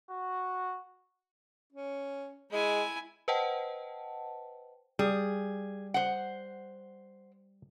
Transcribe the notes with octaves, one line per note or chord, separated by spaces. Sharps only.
F#4
C#4
G#3 E4 G#5
B4 C5 D#5 F#5 G5 A5
G3 G#4
C5 F#5